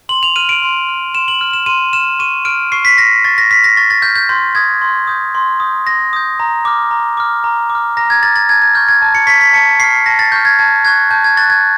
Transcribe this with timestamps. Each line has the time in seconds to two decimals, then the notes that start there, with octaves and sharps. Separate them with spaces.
0.09 C6 F#7
0.23 F7
0.36 F6 D#7
0.49 D7
0.62 C6
0.88 F6
1.15 C6 E7
1.28 F#7
1.41 F6
1.53 E7
1.66 C6 D#7
1.93 F6 E7
2.19 C#6 D#7
2.45 F6 D7
2.72 C#6 C7
2.85 B6
2.98 F6 A#6
3.25 C#6 A6
3.38 A#6
3.51 F6 B6
3.64 A#6
3.77 C#6 A6
3.90 A6
4.02 F6 G6
4.15 G6
4.29 C6 G6
4.55 D#6 G6 G#6
4.82 C6
5.07 D#6 G6
5.35 C6
5.60 D#6 G6
5.86 C6 A#6
6.13 D#6 G6
6.40 A#5
6.65 D6 F6
6.91 A#5
7.17 D6 F6
7.44 A#5
7.70 D6
7.75 F6
7.97 A#5 A#6
8.10 G#6
8.23 D6 F6 A6
8.36 A6
8.49 A5 G#6
8.62 G#6
8.74 C#6 F6 G6
8.88 G#6
9.02 A5
9.15 C#7
9.27 C#6 F6 B6
9.41 B6
9.53 A5 C#7
9.79 C#6 F6 C7
10.06 A5 A#6
10.19 A6
10.32 C#6 F6 G6
10.45 G#6
10.59 A5 G#6
10.85 C#6 F#6 G#6
11.11 A5 G6
11.24 G#6
11.37 C#6 F#6 A6
11.50 G#6